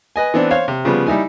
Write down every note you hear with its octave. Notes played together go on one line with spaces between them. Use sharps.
B4 D#5 G#5
E3 B3 C4 D4
C5 C#5 F5
C3
C#3 F3 G3 B3
G3 D#4 E4 G#5